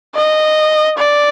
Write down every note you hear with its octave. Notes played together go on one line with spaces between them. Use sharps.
D#5
D5